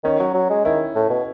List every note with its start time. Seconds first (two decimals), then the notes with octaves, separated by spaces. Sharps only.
0.04 D#3 C#4
0.20 F#3
0.34 F#3
0.50 G#3
0.65 D#3 E4
0.95 A2
1.10 B2